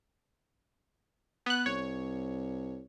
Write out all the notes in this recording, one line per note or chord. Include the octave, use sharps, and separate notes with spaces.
B3 F#6
C2 C#5